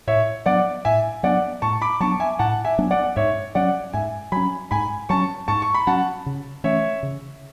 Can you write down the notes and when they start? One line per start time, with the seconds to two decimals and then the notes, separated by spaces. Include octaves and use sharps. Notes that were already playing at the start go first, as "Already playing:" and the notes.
0.07 A2 C#5 E5
0.46 F#3 B3 D4 D5 F#5
0.85 A2 E5 G#5
1.23 F#3 B3 D4 D5 F#5
1.62 A2 A5 C#6
1.81 B5 D6
2.00 F#3 B3 D4 A5 C#6
2.20 E5 G#5
2.39 A2 F#5 A5
2.65 E5 G#5
2.78 F#3 B3 D4
2.91 D5 F#5
3.16 G#2 C#5 E5
3.55 F#3 C#4 D5 F#5
3.93 G#2 E5 G#5
4.32 F#3 C#4 G#5 B5
4.71 G#2 G#5 B5
5.09 F#3 C#4 A5 C#6
5.48 G#2 A5 C#6
5.62 C#6
5.74 B5
5.87 F#3 C#4 F#5 A5
6.26 C#3
6.64 E3 A3 C#4 C#5 E5
7.03 C#3